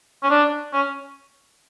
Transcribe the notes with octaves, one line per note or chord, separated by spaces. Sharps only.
C#4
D4
C#4